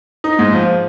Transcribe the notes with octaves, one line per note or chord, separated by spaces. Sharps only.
D#4
G#2
F3